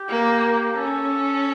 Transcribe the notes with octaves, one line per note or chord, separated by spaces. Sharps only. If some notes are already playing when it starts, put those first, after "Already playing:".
Already playing: G4
A#3
C#4 A4